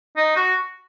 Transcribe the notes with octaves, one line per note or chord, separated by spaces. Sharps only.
D#4
F#4